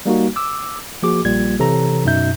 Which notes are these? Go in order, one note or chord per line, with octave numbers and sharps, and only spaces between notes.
G3 A#3 D#4 F#4
D6 E6
F3 A#3 F#4 G#4 D6
A#1 G3 A#3 F4 G#6
C3 E3 A4 C#5 A#5
F#2 B2 D#4 E5 G6